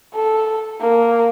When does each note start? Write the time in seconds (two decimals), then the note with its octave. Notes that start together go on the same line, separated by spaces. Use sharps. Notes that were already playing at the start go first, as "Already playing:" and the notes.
0.15 A4
0.81 A#3